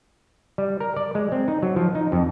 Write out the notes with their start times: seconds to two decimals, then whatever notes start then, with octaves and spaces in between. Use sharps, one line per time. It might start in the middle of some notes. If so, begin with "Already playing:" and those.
0.58 G3
0.80 A#4
0.96 D5
1.15 G#3
1.32 C4
1.48 D#4
1.63 F#3
1.76 F3
1.95 D#4
2.12 F2